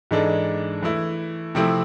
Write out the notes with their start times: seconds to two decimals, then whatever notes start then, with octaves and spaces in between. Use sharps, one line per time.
0.11 G#2 E3 G#3 D4 A4
0.82 E3 A3 E4
1.55 C3 F3 A3 C4 E4